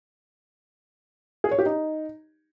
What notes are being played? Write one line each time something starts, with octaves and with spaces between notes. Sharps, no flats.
G#4
C#5
G4
D#4